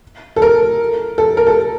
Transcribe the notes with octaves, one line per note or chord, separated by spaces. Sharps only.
A4
A#4
A4
A#4
A4